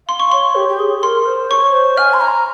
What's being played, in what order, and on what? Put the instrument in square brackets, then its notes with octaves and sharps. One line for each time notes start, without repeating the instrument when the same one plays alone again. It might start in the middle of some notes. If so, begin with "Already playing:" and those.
[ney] F5 [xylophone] C6
[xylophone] C#6
[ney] C#5 [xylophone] C6
[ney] G4
G4
G#4
G#4
[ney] A#4 [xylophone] C6
[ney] C5
[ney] C#5 [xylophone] C#6
[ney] C5
[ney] G#5 [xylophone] F6
[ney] C6
A#5